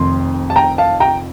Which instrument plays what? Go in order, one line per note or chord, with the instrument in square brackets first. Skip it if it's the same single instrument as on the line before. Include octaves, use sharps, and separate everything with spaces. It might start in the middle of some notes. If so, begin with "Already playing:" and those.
Already playing: [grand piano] F1 F2 D#3 C6
A5
G5 A#5
F5 A5
G5 A#5